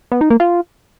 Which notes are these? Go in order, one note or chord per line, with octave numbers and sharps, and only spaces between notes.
B3
D#4
A#3
F4